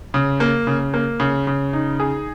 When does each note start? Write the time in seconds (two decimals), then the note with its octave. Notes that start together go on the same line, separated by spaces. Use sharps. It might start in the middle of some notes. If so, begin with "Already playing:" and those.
0.14 C#3
0.40 A#3
0.67 C#3
0.94 A#3
1.20 C#3
1.47 C#3
1.73 D#4
2.00 G#4